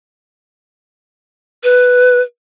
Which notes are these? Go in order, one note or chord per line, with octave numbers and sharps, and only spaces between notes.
B4